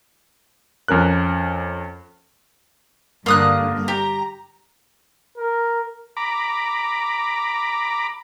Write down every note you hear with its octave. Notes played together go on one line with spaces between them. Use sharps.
F2 C#4 A#4 F#6
G2 D3 A#3 D#6 F#6
G4 A#5
A#4
A#5 B5 D6